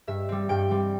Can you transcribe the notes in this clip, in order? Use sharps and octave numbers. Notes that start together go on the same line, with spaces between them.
G2 E5
G3 C4
G2 G5
G3 C4